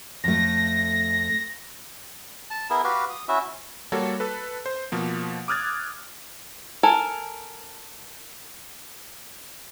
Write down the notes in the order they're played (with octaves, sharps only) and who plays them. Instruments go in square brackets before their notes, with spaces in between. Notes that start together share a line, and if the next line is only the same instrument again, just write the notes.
[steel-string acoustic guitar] F2 A3 [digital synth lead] A#6
[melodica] A5
B3 E4 G#4 A#4
F#4 G4 B4 F5
D#6
C#4 E4 F#4 E5
[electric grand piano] G3 A#3 F#4 A4 C#5
A4 B4
C5
B2 F3 A#3
D6 D#6 F6 F#6 G#6 A6
[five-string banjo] A4 A#4 G#5